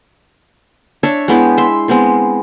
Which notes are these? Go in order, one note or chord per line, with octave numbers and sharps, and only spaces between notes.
D4 C#5 E5
G#3 B3 E4 G5
E5 C6
G#3 B3 C4 C6